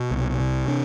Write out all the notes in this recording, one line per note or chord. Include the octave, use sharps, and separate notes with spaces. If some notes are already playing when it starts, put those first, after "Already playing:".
Already playing: B2
C2
C3
D4